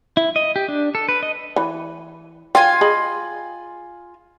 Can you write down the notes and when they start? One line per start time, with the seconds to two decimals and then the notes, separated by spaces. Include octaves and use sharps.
0.17 E4
0.36 D#5
0.56 G4
0.68 D4
0.95 A4
1.09 B4
1.23 D#5
1.56 E3
2.55 F4 G5 G#5
2.81 G#4 D#5 B5